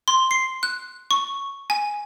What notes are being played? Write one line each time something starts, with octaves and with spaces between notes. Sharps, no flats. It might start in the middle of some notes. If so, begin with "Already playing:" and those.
C6
C7
F#6
C#6
G#5